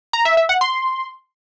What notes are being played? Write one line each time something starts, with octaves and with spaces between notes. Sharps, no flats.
A#5
E5
E5
F#5
C6